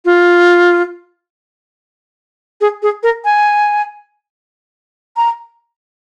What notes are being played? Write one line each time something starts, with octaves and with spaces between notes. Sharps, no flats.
F4
G#4
G#4
A#4
G#5
A#5